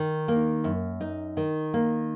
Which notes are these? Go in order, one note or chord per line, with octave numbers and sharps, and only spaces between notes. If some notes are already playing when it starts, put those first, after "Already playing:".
Already playing: D#3 D#4
A#3
F#2
D#4
D#3
A#3